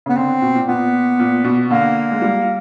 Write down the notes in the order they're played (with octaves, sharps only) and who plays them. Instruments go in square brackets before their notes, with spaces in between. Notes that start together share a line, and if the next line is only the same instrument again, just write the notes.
[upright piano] C#3 [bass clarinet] B3
[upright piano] D3 [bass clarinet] C4
[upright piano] B2
A#2
[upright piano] A#2 [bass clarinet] B3
[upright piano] A#2
B2
[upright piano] D3 [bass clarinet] A#3
[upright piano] G#3
G3